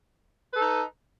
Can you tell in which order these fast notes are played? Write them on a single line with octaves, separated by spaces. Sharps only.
B4 A4 D#4